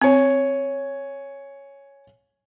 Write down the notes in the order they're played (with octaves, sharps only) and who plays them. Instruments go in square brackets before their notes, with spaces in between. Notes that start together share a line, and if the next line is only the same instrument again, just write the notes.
[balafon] C4 [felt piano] C#5 G#5